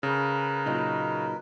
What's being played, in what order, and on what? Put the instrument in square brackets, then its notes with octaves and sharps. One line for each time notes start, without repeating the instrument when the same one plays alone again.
[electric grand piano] C#3 [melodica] A#4 B4
[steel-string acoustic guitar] A#2 F#3 D#4